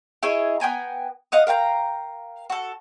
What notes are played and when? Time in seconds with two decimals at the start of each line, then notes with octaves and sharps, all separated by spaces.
0.23 E4 G#4 C#5 D#5
0.60 B3 G5 G#5 A#5
1.32 D#5 F5 F#5 D#6
1.47 A#4 F5 G5 A#5
2.50 F#4 A4